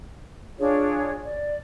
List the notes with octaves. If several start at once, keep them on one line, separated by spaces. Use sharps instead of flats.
D4 F4 G#4 C#5
D5